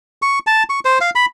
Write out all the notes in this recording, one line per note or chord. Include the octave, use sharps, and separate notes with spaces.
C#6
A5
C#6
C5
F5
B5